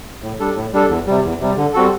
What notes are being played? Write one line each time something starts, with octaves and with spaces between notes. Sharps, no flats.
A2
G3 D4 A4
A2
G3 D4 A4
E2
C3 G3
E2
C3 G3
D3
G3 C4 F#4 A4